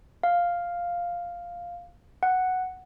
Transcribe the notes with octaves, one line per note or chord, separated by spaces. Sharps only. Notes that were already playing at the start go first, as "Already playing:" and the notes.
F5
F#5